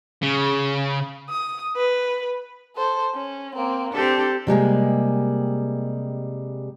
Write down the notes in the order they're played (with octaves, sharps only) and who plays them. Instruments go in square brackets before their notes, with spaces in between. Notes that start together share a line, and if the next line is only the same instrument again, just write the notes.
[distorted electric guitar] C#3
[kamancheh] D#6
B4
A4 C5
C#4
A#3 C4
[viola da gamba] C4 G4 A4 [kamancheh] D4
[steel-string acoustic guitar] C3 G3 G#3 A#3